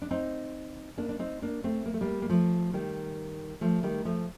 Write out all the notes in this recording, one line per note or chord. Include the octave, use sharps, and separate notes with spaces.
D4
C4 D#4
A#3 D4
D4
C4 D#4
A#3 D4
A3 C4
A#3
A3
G3 A#3
A#3
F3 A3
D#3 G3
F3 A3
D#3 G3
F3 A3